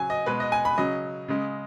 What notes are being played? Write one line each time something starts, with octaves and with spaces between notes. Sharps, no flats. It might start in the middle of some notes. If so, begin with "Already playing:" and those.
Already playing: C#3 F#3 G#5
D#5
B2 G#3 B4
D#5
G#5
B5
C#3 F#3 D#5
C#3 G#3